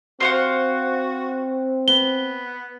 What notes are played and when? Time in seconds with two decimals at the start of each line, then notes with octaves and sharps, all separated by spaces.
0.20 C4 F#4 C5 F5 F#5
1.88 B3 G7